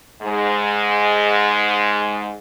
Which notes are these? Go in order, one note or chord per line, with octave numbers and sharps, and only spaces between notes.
G#2 G#3